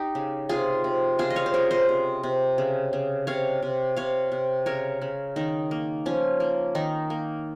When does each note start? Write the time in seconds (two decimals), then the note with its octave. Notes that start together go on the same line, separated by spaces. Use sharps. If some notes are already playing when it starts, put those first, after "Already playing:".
Already playing: D#4 G4
0.15 C#3
0.49 C3 F4 G#4
0.84 C3
1.19 C#3 F4 G#4
1.30 D#5
1.36 C#5 F5
1.46 C5
1.54 C#3 A#4 C#5
1.71 C5 D#5
1.89 C3
2.23 C3
2.58 C#3
2.93 C#3
3.27 C3 C#5 F5
3.62 C3
3.96 C3 C#5 F5
4.32 C3
4.66 C#3 A#4 C#5
5.02 C#3
5.36 D#3 D#4
5.71 A#3
6.06 F3 C#4
6.40 A#3
6.75 D#3 D#4
7.10 A#3